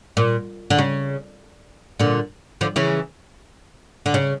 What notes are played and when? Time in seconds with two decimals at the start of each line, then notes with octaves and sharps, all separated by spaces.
0.17 A#2
0.70 D3
0.79 C#3
1.99 A#2 D3
2.61 D3 F3
2.76 C#3 E3
4.06 D3
4.14 C#3